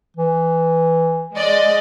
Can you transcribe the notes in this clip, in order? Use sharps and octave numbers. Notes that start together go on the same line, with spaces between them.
E3
G#3 D5 D#5